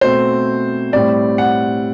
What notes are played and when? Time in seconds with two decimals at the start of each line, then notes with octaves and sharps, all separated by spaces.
0.01 B2 A3 C4 C5
0.92 A2 G3 C4 D5
1.38 F#5